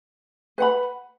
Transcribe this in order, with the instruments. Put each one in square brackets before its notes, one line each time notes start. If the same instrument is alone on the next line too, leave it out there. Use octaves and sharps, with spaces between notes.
[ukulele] B4 F#5 B5